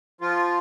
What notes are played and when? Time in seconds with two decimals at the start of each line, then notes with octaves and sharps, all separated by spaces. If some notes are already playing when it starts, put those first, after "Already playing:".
0.21 F3 F4